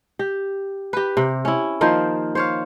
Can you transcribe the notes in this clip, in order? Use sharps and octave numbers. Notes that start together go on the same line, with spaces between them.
G4
G4 B4
C3
C#4 E4
D#3 F3 A#3 C5
C5 C#5 F5